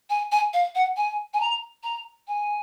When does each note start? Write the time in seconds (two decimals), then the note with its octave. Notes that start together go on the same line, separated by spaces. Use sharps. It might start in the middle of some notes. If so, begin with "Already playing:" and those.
0.10 G#5
0.32 G#5
0.53 F5
0.75 F#5
0.97 G#5
1.34 G#5
1.41 A#5
1.84 A#5
2.28 G#5